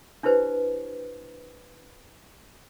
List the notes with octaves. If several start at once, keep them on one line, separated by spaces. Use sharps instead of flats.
D4 E4 G4 B4 C5